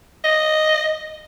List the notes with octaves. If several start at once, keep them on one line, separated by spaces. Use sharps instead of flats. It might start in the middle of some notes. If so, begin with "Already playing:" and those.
D#5